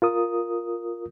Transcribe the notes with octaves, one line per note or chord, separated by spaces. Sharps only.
F4 A#4 D#6